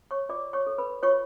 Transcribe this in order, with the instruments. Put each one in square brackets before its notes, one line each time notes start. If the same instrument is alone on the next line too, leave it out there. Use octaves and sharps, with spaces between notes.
[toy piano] C#5 C#6
F4 D5 D6
C#5 C#6
A4 C#5
B4 B5
F4 C#5 C#6